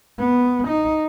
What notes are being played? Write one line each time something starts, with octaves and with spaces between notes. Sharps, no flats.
B3
D#4